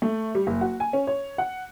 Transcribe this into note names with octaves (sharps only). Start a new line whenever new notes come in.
A3
G3
F#1
F#4
G#5
C#4
C#5
F#5